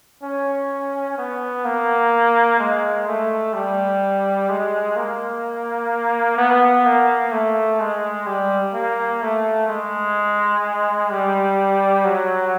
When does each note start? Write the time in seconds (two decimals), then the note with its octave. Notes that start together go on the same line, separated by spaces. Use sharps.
0.23 C#4
1.18 B3
1.65 A#3
2.59 G#3
3.07 A3
3.54 G3
4.49 G#3
4.96 A#3
6.37 B3
6.86 A#3
7.32 A3
7.80 G#3
8.26 G3
8.74 A#3
9.22 A3
9.68 G#3
11.10 G3
12.05 F#3